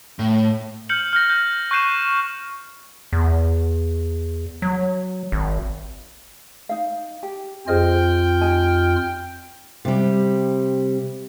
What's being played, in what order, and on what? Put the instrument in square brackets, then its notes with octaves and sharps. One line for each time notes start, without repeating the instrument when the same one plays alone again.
[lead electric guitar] A2
[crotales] F6 G6 C#7 F#7
F6 G6 A#6
G6
C#6 F#6 G6 C7 D#7 E7
[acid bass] E2
F#3
G#1
[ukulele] D#4 F5
G4 G5
[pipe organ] F2 F4 F6 [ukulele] G#4 C5 D#5 [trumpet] G5
[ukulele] D#4 G4 G#5
[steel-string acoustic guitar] C3 G3